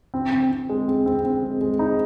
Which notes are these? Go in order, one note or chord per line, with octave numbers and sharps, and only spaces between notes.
C4
C4
C4
G#3
C4
C4
C4
G#3
G#3
D#4